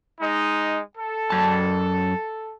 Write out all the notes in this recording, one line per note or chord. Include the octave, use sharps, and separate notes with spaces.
G#3 D#4
A4
F#2 A5